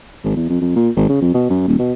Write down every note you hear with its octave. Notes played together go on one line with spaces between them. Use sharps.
G#1
E2
F2
F2
A#2
G#1
C#3
F2
B2
F#2
D#1
B2